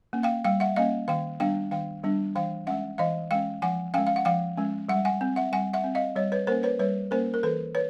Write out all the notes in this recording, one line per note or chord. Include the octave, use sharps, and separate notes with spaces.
A#3 C#4
F5 G5
G3 F5 G5
E5 F#5
A#3 C#4 D#5 F5
D#3 F5 G5
G3 B3 D4 F5 G5
D#3 F5 G5
G3 B3 D4
E3 F5 G5
G#3 C#4 E5 F#5
E3 D#5 F5
G#3 C#4 F5 G5
F3 F#5 G#5
G#3 C#4 F5 G5
F5
F#5
F3 F5 G5
G#3 C#4
G3 E5 F#5
F#5 G#5
C4
E5 F#5
G3 F#5 G#5
E5 F#5
C4
D#5 F5
G3 C#5 D#5
B4 C#5
A#3 C#4 A#4 C5
B4 C#5
G3 B4 C#5
A#3 C#4 A#4 C5
A#4
E3 A4 B4
B4 C#5